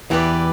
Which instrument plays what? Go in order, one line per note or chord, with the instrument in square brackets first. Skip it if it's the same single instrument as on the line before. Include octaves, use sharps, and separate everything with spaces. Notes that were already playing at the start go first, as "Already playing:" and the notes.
[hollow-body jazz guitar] E2 E3 [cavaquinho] E4 G4 B4 D5